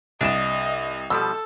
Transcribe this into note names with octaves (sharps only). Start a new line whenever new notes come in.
C2 D4 D#5 E7
B2 F3 G3 A4 E6